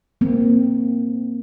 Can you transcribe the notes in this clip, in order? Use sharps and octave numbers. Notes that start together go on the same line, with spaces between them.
A#3 C4